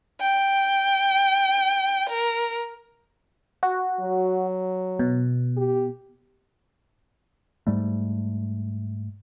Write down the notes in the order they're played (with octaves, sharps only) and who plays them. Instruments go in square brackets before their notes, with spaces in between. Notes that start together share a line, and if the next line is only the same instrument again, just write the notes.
[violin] G5
A#4
[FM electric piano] F#4
[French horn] F#3
[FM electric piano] B2
[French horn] G4
[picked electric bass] G#2 G3 A3